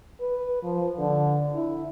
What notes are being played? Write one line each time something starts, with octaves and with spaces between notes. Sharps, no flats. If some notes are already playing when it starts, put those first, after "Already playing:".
B4
F3
D3
E4